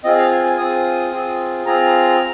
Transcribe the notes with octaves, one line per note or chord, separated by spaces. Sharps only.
C4 F4 G#4 D#5
F5
G#5
G#5
C4 F4 G#4 D#6
C4 F4 G#4
C4 F4 G#4 A#5